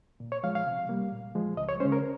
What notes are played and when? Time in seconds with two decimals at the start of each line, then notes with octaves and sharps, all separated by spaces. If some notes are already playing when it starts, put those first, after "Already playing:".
0.20 A#2
0.32 C#5
0.43 F3 G#3 F5
0.55 F5
0.66 C3
0.89 G3 A#3
1.12 A#2
1.35 F3 G#3
1.57 C#2 D#5
1.69 C#5
1.80 C#3 G#3 C#4 C5
1.92 A#4